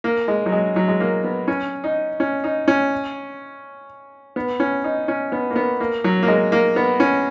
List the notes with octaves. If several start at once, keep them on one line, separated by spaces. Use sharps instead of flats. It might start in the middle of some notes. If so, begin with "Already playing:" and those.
A#3
G#3
F#3
G#3
F#3
G#3
A#3
B3
C#4
D#4
C#4
D#4
C#4
B3
C#4
D#4
C#4
B3
A#3
B3
A#3
F#3
A#3
G#3
A#3
B3
C#4